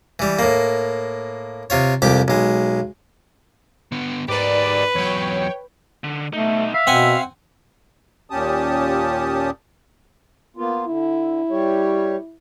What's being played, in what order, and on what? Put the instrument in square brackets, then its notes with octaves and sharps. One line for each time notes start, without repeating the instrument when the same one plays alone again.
[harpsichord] E3 G3
A2 A#3
C3 F4 C#5
C2 F2 G4 D6
B1 G#3
[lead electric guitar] D3 B3
[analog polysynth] G#2 D5 [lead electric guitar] G4 A#4 [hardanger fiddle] B4
[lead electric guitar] E2 F#3 [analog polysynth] C#5 G5
[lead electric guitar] D3
[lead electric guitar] B2 D#4 [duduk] A3
[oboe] E5 [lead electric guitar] F5
[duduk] B2 [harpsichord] C4 F#5 G#5
[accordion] D#2 A#2 C#4 G4 A5 D#6
[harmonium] A#3 B3 F4
[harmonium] D3 [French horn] E4
[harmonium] G3 G4 C#5